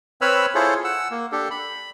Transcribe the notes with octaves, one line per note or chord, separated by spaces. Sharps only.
C4 B4 C#5 B5 E6 F6
E4 F4 G#4 A4 C5 C#5
F#5 E6
A#3
D4 G4 A4
B5